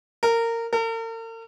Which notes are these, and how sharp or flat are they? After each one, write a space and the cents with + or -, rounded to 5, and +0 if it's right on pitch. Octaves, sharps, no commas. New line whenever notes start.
A#4 -20
A#4 -45